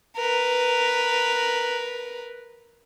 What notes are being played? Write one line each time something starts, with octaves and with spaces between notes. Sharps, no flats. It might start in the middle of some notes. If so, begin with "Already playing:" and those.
A#4 B4